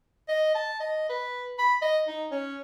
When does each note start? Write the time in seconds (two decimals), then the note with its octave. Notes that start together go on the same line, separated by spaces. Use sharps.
0.29 D#5
0.55 A5
0.80 D#5
1.10 B4
1.59 B5
1.82 D#5
2.08 D#4
2.32 C#4